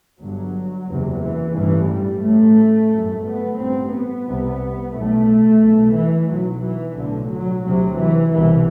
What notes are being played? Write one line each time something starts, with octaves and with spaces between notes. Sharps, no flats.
G1 G2 F#3
F#1 E2 C3
E3
A1 G2 E3
G3
A1 A2 A3
G1 F#2
B3
A1 G2 C4
B3
C2 C3
B1 A2 A3
B1 B2
E3
B1 B2 F#3
E3
B1 A2 D3
F#3
D2 C3 F#3
E3
C2 B2 E3